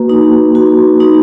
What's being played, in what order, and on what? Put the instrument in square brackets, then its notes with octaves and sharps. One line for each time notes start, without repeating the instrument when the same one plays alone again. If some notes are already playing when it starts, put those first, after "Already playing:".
Already playing: [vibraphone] A#3 F#4 B4
D#4
F#4
D#4